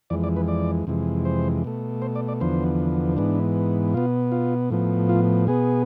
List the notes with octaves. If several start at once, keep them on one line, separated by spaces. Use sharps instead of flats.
F2 E3 G#3 D5
D5
B4
D5
F2 C3 E3 G#3
C5
B2 A3
C5
D5
D5
E2 D3 F3 B3 C5
G#2 E3 B3 D4
B2 B3 F4
F4
A2 F3 B3
F4
B2 B3 G#4